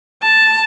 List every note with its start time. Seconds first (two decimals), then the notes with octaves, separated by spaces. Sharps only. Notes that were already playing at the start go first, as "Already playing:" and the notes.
0.22 A5